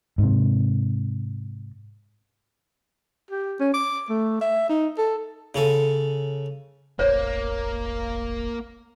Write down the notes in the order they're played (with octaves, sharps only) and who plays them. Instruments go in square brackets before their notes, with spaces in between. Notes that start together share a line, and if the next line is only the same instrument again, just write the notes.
[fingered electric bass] G#2 C3
[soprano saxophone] G4
C#4
D6
A3
E5
D#4
A4
[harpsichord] C#3 C#4 A4
[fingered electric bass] E1 A1 [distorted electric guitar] A#3 [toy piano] C5 C#5